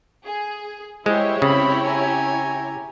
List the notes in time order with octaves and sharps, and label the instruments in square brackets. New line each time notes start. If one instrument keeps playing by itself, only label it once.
[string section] G#4
[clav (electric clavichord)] G#3 [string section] E4 G4 C#5 [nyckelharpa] C5
[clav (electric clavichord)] C#3 [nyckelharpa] C4 B5
[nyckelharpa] G#5 A#5